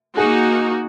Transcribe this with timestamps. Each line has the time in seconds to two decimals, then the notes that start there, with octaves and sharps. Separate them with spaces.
0.17 A#3 D#4 F#4 G#4